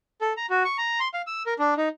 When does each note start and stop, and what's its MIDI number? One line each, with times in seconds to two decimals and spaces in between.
0.21 0.33 69
0.37 0.46 82
0.50 0.63 66
0.65 0.77 85
0.78 1.00 82
1.00 1.08 84
1.14 1.22 77
1.27 1.43 88
1.46 1.54 70
1.59 1.74 62
1.77 1.89 63